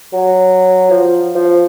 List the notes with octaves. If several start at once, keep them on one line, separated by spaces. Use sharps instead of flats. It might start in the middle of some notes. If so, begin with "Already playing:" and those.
F#3
F3
F3